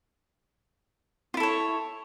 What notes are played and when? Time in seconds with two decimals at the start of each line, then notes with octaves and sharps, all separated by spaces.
1.34 F4
1.37 E4
1.40 A4
1.43 C#5